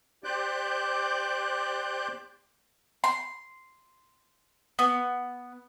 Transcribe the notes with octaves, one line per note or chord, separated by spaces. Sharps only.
G4 C5 D5 D6 F#6 G6
C6
B3